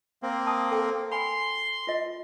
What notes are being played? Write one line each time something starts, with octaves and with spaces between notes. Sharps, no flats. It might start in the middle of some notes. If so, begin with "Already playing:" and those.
A#3 C4
A5 D#6
A4 G5
G#5 B5 C6
F4 D#5